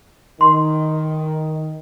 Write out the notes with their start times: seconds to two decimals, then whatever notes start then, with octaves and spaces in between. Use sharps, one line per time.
0.41 D#3 C6